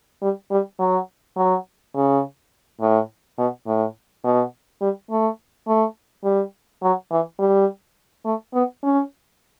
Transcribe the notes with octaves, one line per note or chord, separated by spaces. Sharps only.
G3
G3
F#3
F#3
C#3
A2
B2
A2
B2
G3
A3
A3
G3
F#3
E3
G3
A3
B3
C#4